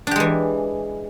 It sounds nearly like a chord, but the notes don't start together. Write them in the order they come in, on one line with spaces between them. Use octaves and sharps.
D4 G4 G#3 E3